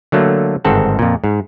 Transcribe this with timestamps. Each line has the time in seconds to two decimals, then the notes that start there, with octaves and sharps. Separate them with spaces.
0.12 D3 F#3 A3 A#3
0.65 G1 G#2 D#3 C4 A4 F#5
0.99 F2 A#2
1.24 G#2